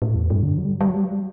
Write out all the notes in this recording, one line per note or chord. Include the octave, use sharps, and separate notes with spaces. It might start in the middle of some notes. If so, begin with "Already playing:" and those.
A2
E2
G2
D3
F#3
G3
F#3
G3
F#3
G3
F#3
G3